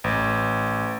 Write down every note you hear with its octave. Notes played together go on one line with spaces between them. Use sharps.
A1